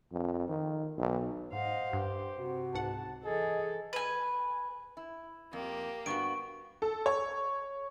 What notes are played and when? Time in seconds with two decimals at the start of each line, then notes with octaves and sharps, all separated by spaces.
0.12 F2
0.48 D#3
0.98 B1
1.52 G#2 C5 D#5 F5 F#5
1.93 G2 G4
2.37 C3 F#4
2.74 C#2 G#2 F#5 A5
3.24 E3 G#4 A4 D#5
3.93 B4 G#5
4.97 E4
5.53 F2 A#3 G4
6.06 G2 B3 F#4 C#6 D7
6.82 A4
7.06 C#5